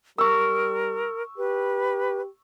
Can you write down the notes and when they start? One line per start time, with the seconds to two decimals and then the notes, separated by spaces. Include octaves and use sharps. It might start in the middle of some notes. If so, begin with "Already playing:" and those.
0.18 G3 A#4 C#6 E6
1.38 G4 B4